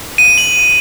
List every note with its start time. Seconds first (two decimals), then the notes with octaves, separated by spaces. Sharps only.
0.18 D#7
0.38 F#7